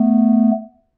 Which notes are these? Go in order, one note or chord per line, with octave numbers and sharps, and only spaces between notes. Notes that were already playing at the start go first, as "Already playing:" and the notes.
Already playing: A3 B3